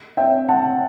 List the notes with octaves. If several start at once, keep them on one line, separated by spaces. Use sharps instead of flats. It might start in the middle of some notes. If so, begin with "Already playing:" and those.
E5 G5
F#5 A5